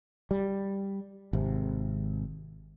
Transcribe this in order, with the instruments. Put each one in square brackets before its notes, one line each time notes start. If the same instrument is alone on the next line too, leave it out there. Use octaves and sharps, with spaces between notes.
[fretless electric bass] G3
G#1 C3